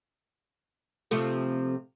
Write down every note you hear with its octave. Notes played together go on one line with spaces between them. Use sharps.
C3 F3 A3